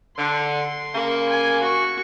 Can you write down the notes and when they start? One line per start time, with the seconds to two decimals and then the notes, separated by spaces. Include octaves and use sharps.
0.18 D3 C6
0.94 C#3 A#3
1.29 G#5
1.60 F#4 C#6